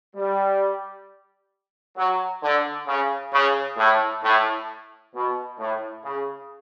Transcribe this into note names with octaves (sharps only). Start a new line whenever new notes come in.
G3
F#3
D3
C#3
C#3
A2
A2
B2
A2
C#3